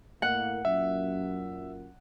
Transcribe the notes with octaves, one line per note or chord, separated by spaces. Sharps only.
A2 A#3 F#5
F#2 A#2 E5